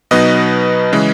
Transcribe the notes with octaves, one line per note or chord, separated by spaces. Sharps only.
B2 F#3 B3 D#4 B4 D#5
C#3 E3 G#3